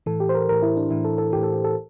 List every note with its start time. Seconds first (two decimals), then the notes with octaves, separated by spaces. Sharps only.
0.06 A2 E3 A4
0.20 G4
0.29 C5
0.35 A#4
0.49 A2 E3 A#4
0.62 E4
0.77 D4
0.91 A2 E3 E4
1.05 A4
1.18 A4
1.32 A2 E3 G4
1.43 A4
1.53 G4
1.64 A4